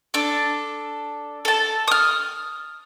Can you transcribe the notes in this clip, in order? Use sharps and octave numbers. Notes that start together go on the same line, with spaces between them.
D4 A4
A4 A5
D#6 F6